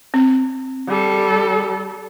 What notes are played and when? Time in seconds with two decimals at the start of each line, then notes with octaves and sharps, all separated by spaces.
0.14 C4
0.88 G3 A4